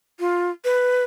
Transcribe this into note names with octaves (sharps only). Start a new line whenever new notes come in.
F4
B4